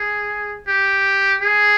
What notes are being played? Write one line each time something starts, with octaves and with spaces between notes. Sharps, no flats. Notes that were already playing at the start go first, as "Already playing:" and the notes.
Already playing: G#4
G4
G#4